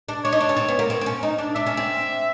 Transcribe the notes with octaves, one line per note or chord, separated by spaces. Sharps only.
D4
D4 C#5
D#4
D4
C#4
C4
B3
A#3
C4
C4
C#4
D#4
D4
D4 E5
C#4
C4